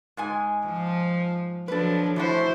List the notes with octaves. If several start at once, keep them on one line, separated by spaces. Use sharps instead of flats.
G#2 G#3 G#5
F3
F3 F#3 D4 A4 B4
E3 A3 E4 F#4 C5